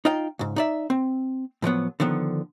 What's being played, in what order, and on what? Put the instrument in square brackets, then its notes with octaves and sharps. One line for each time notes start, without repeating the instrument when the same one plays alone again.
[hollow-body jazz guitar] D#4 F4 D#5 F5 G5
C#2 G#2
D#4 D5 E5
C4
A2 F3 F#3 B3
D3 D#3 F3 B3